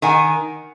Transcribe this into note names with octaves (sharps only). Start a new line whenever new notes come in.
D#3 F#5 G#5